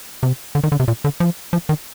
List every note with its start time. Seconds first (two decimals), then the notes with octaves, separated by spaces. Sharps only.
0.23 C3
0.55 D3
0.64 D#3
0.72 D3
0.80 C3
0.88 A#2
1.04 D3
1.20 F3
1.53 F3
1.69 D#3